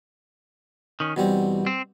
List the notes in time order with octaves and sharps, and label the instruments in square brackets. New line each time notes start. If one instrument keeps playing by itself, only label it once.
[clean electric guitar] D#3 C#4
[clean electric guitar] E2 [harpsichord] B2 G3 C4
[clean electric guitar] C4